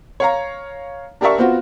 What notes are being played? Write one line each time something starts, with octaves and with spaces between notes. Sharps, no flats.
C#5 F5 A#5
D4 G4 A#4 D5 E5 C#6
B3 C4 F4 F#4